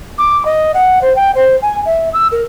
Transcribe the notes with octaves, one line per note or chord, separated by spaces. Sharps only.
D6
D#5
F#5
C5
G5
C5
G#5
E5
E6
A#4